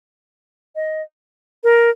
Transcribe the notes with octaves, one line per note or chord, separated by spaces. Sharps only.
D#5
A#4